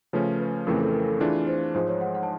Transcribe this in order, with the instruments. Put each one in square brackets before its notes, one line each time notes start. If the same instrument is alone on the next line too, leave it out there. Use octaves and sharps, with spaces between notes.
[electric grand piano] C#3 F3 A3 C#4 [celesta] B4
[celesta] B4
[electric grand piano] F2 C#3 E3 A3 C4 [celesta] A#4
[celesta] A4
A#4
A4
[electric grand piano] E3 A3 D4 F4 [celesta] G#4
[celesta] C5
[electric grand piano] G#2 F3 G#3 [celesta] C5
[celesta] C#5
F#5
F#5
A5